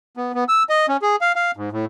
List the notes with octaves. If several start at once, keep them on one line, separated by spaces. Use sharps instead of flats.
B3
B3
E6
D#5
C#4
G#4
F5
F5
G#2
A2